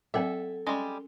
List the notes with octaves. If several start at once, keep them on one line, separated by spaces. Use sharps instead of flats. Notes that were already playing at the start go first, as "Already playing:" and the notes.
F#3 C4 A4 E5 G5 G#5
G3 G#3 C#4 C6